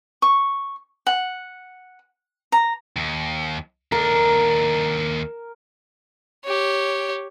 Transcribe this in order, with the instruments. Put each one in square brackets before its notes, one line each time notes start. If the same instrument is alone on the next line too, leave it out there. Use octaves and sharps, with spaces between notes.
[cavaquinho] C#6
F#5
A#5
[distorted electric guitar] D#2
[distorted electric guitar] D#2 D4 [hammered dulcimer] A#4
[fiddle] G4 C#5